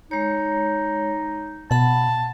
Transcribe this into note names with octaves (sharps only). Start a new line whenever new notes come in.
G#3 D#4 C#5
B2 F#5 A5 B5